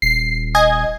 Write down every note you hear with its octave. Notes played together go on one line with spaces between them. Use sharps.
D#1 C7
D#5 G#5 G#6